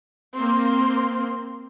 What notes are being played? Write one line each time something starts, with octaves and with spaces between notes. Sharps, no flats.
A#3 C4 C6